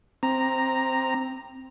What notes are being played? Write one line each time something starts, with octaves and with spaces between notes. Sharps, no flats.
C4 A#5